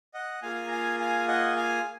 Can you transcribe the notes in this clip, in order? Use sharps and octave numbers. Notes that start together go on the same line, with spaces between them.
D#5 F#5
A#3 F4 G#4 F5 G#5
A#5
F5 G#5
F5 G#5
D#5 F#5
F5 G#5